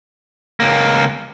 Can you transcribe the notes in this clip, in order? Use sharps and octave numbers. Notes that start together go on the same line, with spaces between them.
C#2 A#3